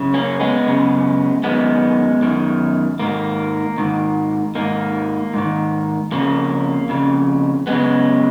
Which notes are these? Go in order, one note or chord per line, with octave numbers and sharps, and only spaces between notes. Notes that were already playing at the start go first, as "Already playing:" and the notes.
Already playing: F#2 C#3
A#3 C#4
G#3 B3
F#2 C#3
F#2 D#3 G#3 B3
F#2 D#3
G#2 D#3 A#3
G#2 D#3
G#2 D#3 A#3
G#2 D#3
F2 C#3 A#3
F2 C#3
F#2 C#3 G#3 B3